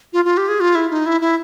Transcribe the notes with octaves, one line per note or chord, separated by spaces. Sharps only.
F4
F4
G4
G#4
F4
E4
D#4
E4
E4